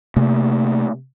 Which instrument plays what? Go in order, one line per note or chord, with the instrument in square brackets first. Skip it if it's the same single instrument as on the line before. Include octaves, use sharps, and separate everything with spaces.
[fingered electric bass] C3 A3 A#3